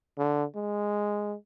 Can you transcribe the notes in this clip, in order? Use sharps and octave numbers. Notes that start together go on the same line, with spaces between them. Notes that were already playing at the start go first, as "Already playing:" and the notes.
D3
G#3